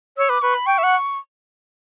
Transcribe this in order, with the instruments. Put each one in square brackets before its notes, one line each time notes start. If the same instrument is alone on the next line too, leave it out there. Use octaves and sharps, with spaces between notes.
[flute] C#5 [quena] E6
[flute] B4 [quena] D6
[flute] B4 [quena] C#6
[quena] B5
[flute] G5 [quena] C#6
[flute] E5
F#5